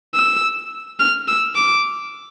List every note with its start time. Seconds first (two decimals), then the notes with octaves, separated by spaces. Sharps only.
0.15 E6
1.00 F6
1.28 E6
1.55 D6